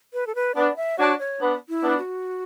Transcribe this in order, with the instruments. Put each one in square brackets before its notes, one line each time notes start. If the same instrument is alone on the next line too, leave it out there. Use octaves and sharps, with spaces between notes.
[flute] B4
A4
B4
[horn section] B3 D4 [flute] D5
[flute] E5
[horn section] D4 F#4 [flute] C#5
[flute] C#5
[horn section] B3 D4
[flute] E4
[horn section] B3 D4
[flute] F#4